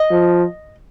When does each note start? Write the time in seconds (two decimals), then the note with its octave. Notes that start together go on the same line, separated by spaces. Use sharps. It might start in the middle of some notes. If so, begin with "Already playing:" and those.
Already playing: D#5
0.11 F3